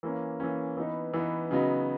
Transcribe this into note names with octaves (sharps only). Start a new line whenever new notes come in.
E3 A#3 C#4
E3 A#3 C#4
E3 B3 D#4
E3 B3 D#4
C#3 F#3 B3 D#4